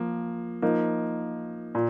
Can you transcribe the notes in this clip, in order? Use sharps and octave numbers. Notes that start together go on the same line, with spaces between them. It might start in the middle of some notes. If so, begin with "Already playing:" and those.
Already playing: F3 A#3
F3 A#3 D#4
A#2